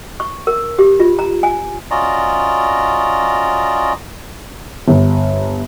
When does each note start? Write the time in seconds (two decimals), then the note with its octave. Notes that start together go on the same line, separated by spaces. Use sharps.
0.20 C#6
0.47 A#4
0.79 G4
1.00 F4
1.19 A#5
1.43 G#5
1.91 C#4 F4 F#4 D5 D#5 A#5
4.88 G1